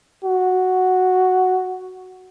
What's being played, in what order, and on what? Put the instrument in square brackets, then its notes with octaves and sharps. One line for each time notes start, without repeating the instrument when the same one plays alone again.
[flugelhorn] F#4